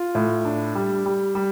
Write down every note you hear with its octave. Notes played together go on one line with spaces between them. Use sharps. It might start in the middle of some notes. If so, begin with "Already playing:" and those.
Already playing: F4
A2
D4
G3
G3
G3